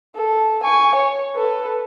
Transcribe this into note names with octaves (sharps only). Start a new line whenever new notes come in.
A4
G#5 C#6
C#5
A4 B4